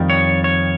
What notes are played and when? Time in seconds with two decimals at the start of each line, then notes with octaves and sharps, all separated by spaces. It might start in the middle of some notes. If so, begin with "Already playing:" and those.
Already playing: F2 D#3 G3
0.10 C#5
0.44 C#5